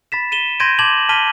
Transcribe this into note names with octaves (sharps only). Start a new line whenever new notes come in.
B5 A6 B6 E7
D#7 E7 G7
C6 G6 G#6 A#6 D7 D#7
A5 C6 D6 G#6 E7 F#7
A5 F6 B6 D#7 G7